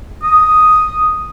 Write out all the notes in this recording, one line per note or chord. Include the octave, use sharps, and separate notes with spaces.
D#6